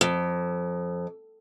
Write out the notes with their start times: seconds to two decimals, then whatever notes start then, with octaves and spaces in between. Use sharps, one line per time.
0.01 F2